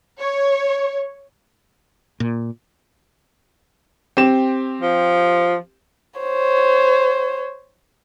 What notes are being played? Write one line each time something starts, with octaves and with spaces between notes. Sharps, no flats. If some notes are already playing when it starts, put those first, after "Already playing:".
C#5
A#2
C4 G4 E7
F3
C5 C#5